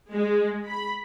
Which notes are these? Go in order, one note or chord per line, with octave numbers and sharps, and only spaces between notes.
G#3
B5